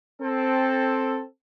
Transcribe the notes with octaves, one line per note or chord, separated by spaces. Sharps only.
C4 A4